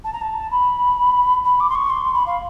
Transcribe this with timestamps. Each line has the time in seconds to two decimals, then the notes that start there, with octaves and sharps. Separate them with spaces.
0.04 A5
0.13 A#5
0.21 A5
0.51 B5
1.44 B5
1.60 D6
1.69 C6
1.75 C#6
1.90 C6
2.13 B5
2.26 F5